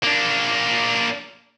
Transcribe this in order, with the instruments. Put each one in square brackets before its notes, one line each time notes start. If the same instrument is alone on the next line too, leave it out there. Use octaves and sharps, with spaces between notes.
[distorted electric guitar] A#3 D4